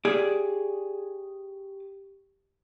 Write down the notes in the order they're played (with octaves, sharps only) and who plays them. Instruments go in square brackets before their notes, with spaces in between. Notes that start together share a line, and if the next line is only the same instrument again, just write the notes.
[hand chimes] G4 [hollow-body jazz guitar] G#4 D5